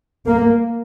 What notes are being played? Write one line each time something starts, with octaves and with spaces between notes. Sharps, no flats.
A#3